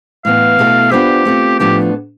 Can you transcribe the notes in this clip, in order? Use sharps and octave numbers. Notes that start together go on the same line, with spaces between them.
A2 E3 B3 F5
B2 A3 E4 A4
B3 D4 F4 G4 C5
A3 C4 F4
A2 F3 B3 D4 G4 A4